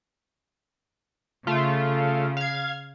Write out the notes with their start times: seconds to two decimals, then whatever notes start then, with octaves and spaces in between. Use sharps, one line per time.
1.47 C#3 A3 F4
2.37 F5 G#6